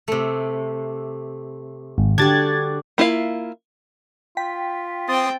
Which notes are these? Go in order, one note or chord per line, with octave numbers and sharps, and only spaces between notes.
C3 A3
G#1
D3 D4 F#4 G4 G#6 A6
A#3 E4 F4 F5
F4 G5 B6
C4 G5 C6 D#6 A6